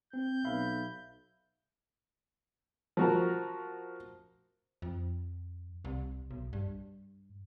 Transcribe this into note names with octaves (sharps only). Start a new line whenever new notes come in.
C4 G6
B1 E5 F5 B5
F3 F#4 A#4
F2
C2
B1
G2